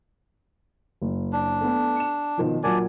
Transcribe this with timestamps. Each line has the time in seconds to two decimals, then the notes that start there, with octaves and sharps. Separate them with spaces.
1.02 F#1
1.33 D4
1.61 A3 B3
1.96 C#7 E7
2.38 B2 D#3 F3
2.63 A#2 F#3 A#3 D4 D5 G#5